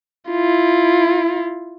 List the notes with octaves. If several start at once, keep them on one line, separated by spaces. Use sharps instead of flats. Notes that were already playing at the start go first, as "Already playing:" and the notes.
E4 F4